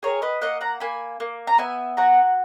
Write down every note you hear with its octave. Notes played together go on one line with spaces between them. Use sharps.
G#4 A#4 C#5
B4 D#5
A#3 D#5 F#5
F#5 A#5
A#3 G#5 B5
A#3
A#5
B3 E5 G#5
F#4 F#5 A#5